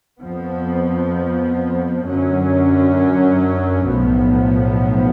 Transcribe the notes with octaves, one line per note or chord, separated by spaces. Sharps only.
F2 F3 B3
F#2 D3 F#3 C#4
B1 A2 F3 B3